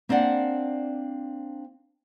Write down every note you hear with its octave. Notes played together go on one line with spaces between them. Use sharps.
A#3 C4 D4 D5 F#5